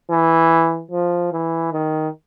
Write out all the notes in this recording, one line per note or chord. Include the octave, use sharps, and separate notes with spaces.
E3
F3
E3
D#3